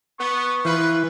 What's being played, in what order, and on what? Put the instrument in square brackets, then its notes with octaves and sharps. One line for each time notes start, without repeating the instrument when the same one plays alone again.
[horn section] B3 [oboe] C#6
[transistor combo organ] E3 [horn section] F3 B4